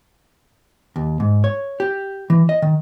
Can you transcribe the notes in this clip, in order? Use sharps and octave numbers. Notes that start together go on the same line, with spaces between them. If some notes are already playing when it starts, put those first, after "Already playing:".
D#2
G#2
C#5
G4
E3
D#5
D#3